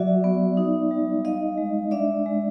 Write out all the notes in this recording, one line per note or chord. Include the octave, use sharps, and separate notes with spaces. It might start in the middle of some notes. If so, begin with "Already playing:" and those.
Already playing: F#3 F#4 D5 E5
B3
D#4
G3
D#4 D#5 F5
G#3
D4 D5 E5
G#3